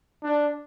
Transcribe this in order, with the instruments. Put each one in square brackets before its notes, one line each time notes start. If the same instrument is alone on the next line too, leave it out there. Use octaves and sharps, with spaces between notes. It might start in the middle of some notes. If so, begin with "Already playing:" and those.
[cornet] D4